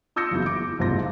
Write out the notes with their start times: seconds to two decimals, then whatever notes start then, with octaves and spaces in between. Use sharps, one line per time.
0.16 F4 D#6 E6 G6 A#6 C#7
0.31 F#1 E2 F#3 E4
0.46 D6
0.79 F#1 C2 G#2 C4 F4 A#6